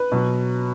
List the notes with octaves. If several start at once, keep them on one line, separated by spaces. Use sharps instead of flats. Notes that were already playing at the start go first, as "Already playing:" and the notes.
Already playing: B4
B2 F#3